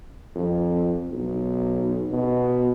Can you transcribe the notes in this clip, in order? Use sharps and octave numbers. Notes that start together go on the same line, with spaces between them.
F2
B1
B2